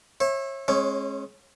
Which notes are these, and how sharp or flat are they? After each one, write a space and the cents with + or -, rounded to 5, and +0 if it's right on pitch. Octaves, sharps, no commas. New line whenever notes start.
C#5 -35 E5 +0
G#3 +15 C#4 -35 C#5 +0